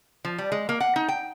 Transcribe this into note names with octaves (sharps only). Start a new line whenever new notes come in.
F3
G3
G#3
A#3
F#5
D#4
G5